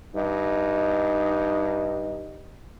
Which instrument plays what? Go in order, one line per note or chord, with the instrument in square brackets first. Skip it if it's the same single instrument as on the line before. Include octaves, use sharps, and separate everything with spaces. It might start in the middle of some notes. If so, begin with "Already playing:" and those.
[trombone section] G2 D#4